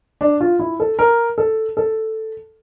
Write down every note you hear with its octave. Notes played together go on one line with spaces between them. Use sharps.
D4
F4
E4
A4
A#4
A4
A4